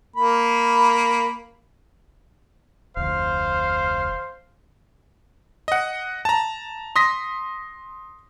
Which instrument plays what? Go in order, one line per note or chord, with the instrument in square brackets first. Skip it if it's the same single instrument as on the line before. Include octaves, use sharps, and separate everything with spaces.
[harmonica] A#3 B5
[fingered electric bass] F1 D2 [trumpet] C5 [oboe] F5
[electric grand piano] D#5 F#5
A5 A#5
C6 D#6 A#6 B6